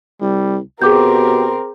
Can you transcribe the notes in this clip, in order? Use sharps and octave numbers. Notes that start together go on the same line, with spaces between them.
C2 G3
B2 C4 G4 G#4 A#4 D6 G6